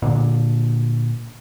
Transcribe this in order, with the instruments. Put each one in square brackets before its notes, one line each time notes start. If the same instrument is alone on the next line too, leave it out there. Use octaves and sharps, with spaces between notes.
[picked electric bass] A#2 D3